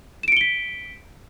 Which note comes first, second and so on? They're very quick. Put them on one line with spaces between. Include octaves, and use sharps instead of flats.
E7 D7 C#7 G7 B6